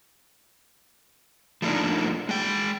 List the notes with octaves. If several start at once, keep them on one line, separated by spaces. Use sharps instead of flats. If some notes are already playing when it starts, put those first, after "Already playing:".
F3 A3 A#3 D4 D#4
G#3 G5